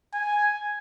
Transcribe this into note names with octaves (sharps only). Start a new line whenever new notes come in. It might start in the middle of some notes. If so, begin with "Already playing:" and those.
G#5